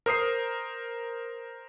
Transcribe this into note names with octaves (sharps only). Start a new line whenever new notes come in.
A#4 C5 D#6 C7